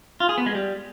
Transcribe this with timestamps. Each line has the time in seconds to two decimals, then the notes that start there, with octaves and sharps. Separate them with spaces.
0.20 F4
0.29 G#4
0.38 B3
0.46 G#3
0.55 G3